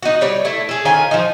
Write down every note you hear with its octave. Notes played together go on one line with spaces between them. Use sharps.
D#4 F#4
G3 C#5 D5
A3 E4
G#4 A4
D#3 C#4 F4 G#5
F3 D#4